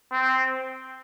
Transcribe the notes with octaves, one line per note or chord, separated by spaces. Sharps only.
C4